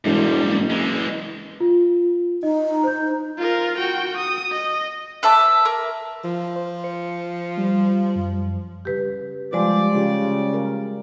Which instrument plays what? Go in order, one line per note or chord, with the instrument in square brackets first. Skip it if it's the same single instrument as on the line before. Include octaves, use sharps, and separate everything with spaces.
[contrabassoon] E1 [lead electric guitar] G#2 G3
[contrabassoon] F#1
[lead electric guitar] E3 G#3
[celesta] F4
[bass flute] D#4 [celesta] D#5
[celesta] C5 G6
[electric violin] F4 A#4
F#4 G5
D#6
D#5
[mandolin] B4 E5 A5 D6
A#4
[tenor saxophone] F3
[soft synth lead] C5
C#7
G3
F#2
[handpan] C#3 G3 [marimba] G4 B4
[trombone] F3 [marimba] G3 G#3 [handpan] G4 C5 [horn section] D5
[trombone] C#3 [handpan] F4 G4
[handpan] A#4